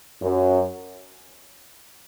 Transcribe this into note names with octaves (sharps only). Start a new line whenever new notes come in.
F#2